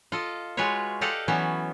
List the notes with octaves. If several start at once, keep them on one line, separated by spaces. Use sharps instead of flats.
F4 A4 D#5
G#3 F4 F#4 B4 C#5
G4 A4 D5 D#5 F5 F#5
E3 F#3 B3 C#4